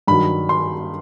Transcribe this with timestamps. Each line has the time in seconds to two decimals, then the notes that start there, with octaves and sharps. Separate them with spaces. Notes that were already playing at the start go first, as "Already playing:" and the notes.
0.07 G2 D#3 F#3 B5
0.49 C6